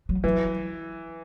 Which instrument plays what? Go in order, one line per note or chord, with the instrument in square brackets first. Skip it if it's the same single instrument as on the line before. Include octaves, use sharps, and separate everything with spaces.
[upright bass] F#3
[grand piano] E3 [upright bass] F#3